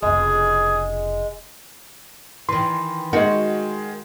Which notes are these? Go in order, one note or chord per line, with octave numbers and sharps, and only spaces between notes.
F1 C#3 G#3 G#4
D#3 E3 C6
D#3 G#3 F#4